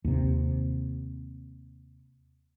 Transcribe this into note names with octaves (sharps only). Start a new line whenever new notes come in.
D#2 C3